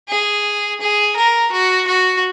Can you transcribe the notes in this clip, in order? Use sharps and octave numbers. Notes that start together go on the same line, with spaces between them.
G#4
G#4
A#4
F#4
F#4